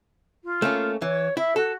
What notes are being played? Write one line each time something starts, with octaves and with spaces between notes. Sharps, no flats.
F4
A3 A#3 C#4
E3 C#5
E4 E5
F#4 A4